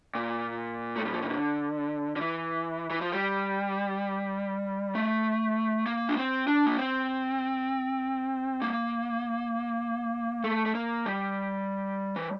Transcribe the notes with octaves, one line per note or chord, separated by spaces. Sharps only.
A#2
A3
G3
F3
E3
D3
D3
E3
E3
F3
G3
A3
A#3
D4
C4
D4
A#3
C4
A#3
A3
A3
A#3
G3
E3